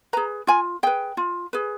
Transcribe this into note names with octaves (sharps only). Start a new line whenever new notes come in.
G#4 B4 A#5
F4 G#5
G#4 B4 G5
F4
G#4 B4